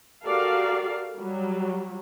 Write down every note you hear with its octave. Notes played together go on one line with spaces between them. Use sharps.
F#4 G4 A4 A#4 D5 F5
F#3 G3